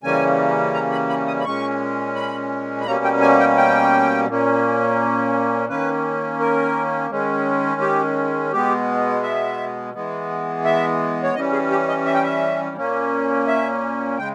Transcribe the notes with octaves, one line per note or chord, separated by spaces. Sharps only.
C#3 E3 G3 A#3 C#4 G#5
A#5
B5
B5
D#6
B5
A#2 G#3 C#4 C#6
B5
B5
B2 G3 A#3 C#4 A#5
G5
G#5
G5
G5
A#2 A#3 C#4
D#3 A#3 C#4 B4
A#4
D#3 G#3 C#4
G4
B2 G#3 B3 G4
E5
E3 G#3 B3
E5
C#5
E3 G3 C#4 D#5
G#4
G4
D#5
E5
G5
E5
A#2 A#3 C#4
E5
C#3 G#3 G5